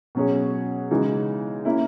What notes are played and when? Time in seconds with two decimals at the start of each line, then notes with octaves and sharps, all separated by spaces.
0.15 B2 F#3 C#4 G#4 C#5
0.91 C#3 E3 G#3 D#4
1.65 A#3 C#4 E4